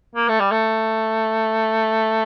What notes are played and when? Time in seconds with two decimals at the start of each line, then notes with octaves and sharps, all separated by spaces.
0.16 A#3
0.28 A3
0.40 G3
0.51 A3